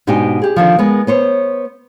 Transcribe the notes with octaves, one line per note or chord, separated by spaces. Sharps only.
G#2 B2 D4 D#4 G4 G#5
G4 G#4
D3 D#3 F3
G#3 B3 A#4
B3 C5 C#5